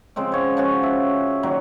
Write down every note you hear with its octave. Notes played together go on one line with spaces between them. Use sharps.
C#3 F3 G#3 C4
G#3 C#5 F#5
F3 C#4 F#4
E5
A#2 D#3 F#3